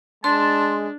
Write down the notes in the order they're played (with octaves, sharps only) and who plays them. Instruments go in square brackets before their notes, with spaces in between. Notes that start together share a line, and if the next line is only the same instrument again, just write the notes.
[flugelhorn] G#3 [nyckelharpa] D4 [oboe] A5 [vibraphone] C6